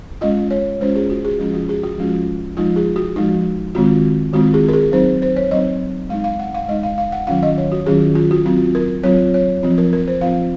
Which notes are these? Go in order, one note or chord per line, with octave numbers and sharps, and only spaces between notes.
G#3 C#4 F4 D#5
C#5
G#3 C#4 F4 C5
G#4
F#4
G#4
F3 G#3 C#4 F4
F#4
G#4
F#4
F3 G#3 C#4 F4
F3 G#3 D#4 F4
G#4
F#4
F3 G#3 D#4 F#4
D#3 G#3 C4 F4 F#4
D#3 G#3 C4 F4 F#4
G#4
A#4
G#4
F#3 C4 D#4 C5
C5
C#5
F#3 C4 D#4 D#5
G#3 D#4 F5
F5
F#5
F5
G#3 D#4 D#5
F5
F5
F#5
D#3 F#3 C#4 F4 F5
D#5
C#5
F#4
D#3 F#3 C#4 F4 G#4
F4
F#4
F#3 C4 F4
A#4
F#3 C4 F4 C#5
C#5
F3 C4 F4
A#4
A#4
C5
F3 C4 F4 F5